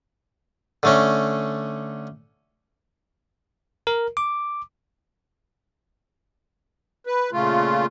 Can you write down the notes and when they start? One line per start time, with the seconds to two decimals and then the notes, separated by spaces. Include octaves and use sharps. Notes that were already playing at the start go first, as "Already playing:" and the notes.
0.83 D3 A3 C#4
3.87 A#4
4.17 D6
7.07 B4
7.32 A#2 C#3 A3 F4